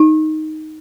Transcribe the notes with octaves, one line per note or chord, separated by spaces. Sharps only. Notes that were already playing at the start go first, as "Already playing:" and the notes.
Already playing: D#4